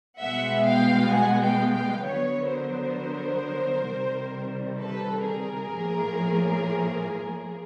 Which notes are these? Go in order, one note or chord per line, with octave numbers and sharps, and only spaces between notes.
B2 G#3 B3 E5 F#5
F5 G5
F#5 G#5
F5 G5
F5 G5
D3 F#3 B3 B4 C#5
A#4 C5
C3 D#3 G3
A4 B4
G#4 A#4
A2 F3 A#3